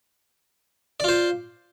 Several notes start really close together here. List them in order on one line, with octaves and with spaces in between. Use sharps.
D5 F4 C5